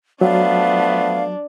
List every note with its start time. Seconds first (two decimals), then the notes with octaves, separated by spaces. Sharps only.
0.21 F3 F#3 A3 B3 D4 F5